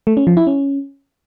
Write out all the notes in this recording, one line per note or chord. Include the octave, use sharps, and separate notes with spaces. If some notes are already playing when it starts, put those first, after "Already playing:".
A3
C#4
F3
E4
C#4